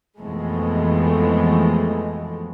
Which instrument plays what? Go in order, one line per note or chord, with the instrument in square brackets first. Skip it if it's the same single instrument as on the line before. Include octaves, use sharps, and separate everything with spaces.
[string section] F2 B2 E3 F3 G#3 A3